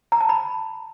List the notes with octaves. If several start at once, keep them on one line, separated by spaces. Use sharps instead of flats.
A#5
A5
B5